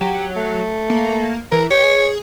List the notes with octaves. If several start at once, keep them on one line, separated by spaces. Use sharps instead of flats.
F#3 G4
A3
A#3
E3 A#4
G4 C#5
G#4